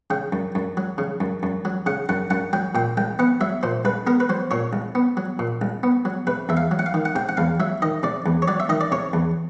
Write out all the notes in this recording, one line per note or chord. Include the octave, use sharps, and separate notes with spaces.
C#3 G5
F#2
F#2
F#3
C#3
F#2
F#2
F#3
C#3 F#5
F#2 F#5
F#2 F#5
F#3 G5
A#2 G5
C2 G5
B3 F#5
F#3 E5
A#2 C5
C2 B4
B3 A#4
B4
F#3 C5
A#2 C#5
C2
B3
F#3
A#2
C2
B3
F#3
C3 B4
E2 E5
F5
F#3
F#5
F5
D#3
F#5
C3 G5
F#5
E2 F5
F#3 E5
D#3 D#5
C3 D5
E2
C#5
F#3 D5
E5
D#3 D#5
D5
C3 C#5
E2